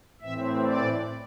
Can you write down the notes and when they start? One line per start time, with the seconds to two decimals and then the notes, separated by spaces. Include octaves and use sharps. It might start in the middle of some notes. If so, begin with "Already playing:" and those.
0.21 A2 E3 C4 E5
0.64 D5